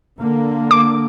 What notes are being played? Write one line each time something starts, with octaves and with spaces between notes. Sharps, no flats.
D3 A#3
D6